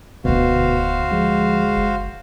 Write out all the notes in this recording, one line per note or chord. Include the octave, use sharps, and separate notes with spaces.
D#1 D2 B2 D3 F#4 C5 F5
F3 G#3
F#1